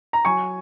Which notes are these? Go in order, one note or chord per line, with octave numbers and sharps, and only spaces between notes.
A#5
F#3 G#5 C#6